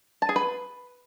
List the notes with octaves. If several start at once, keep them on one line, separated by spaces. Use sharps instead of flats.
A5
G#4
B4